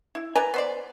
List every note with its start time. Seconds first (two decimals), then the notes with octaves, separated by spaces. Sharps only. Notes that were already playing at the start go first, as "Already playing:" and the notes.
0.15 E4
0.35 B4 D5 G#5 A#5
0.54 B3 C5 D5